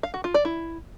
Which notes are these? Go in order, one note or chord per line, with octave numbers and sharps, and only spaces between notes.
F5
F#4
F4
D5
E4